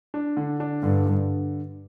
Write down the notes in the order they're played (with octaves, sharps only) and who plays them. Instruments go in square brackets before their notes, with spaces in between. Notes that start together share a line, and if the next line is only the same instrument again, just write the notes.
[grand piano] D4
D3
D4
[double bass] G2 [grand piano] D3
[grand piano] D3